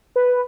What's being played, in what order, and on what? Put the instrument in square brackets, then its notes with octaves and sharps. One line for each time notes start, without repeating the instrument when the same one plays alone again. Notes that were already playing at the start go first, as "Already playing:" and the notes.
[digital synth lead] B4